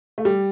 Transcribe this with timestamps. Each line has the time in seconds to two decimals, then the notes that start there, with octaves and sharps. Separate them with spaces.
0.18 A3
0.25 G3